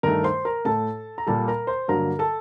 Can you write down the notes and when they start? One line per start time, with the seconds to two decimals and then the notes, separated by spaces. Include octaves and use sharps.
0.03 G2 D#3 A3 A#4 A#5
0.24 C5 C6
0.45 A#4 A#5
0.65 A2 A3 A4 A5
1.18 A#5
1.27 A#2 G3 A#3 A4 A5
1.48 A#4 A#5
1.67 C5 C6
1.88 G2 D3 F#3 A#3 A#4 A#5
2.19 A4 A5